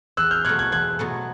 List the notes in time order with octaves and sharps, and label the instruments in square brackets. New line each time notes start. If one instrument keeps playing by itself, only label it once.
[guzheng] E2 [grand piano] E6 F#6
[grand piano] F6 G6
[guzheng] B2 F#3 A3 [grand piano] F#6 G#6
[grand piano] F#6 G#6
[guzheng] E2 [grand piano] F#6 G#6
[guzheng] B2 F#3 A3